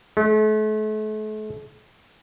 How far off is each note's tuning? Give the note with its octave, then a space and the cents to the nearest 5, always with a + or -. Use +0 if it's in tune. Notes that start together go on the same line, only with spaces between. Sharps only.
A3 -40